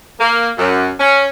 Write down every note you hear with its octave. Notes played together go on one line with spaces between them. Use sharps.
A#3
F#2
C#4